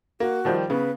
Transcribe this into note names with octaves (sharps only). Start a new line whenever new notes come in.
A#3 F#4
D#3 F3 G3
C#3 B3 B4